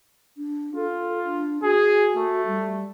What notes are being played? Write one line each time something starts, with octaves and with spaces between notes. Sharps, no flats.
D4
F4 A4
D4
F#4 G#4
A3
G3